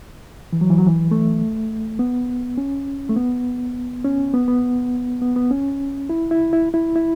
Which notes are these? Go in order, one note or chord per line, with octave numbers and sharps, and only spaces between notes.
E3
F#3
E3
F#3
E3
A3
B3
C#4
A3
B3
C#4
B3
B3
B3
B3
C#4
E4
E4
E4
E4
E4